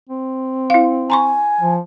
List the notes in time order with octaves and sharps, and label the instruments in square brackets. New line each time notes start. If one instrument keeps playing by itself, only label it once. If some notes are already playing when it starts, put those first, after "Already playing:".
[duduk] C4
[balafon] E4 F5
[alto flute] G#5 [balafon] A#5 C6 C#6
[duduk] F3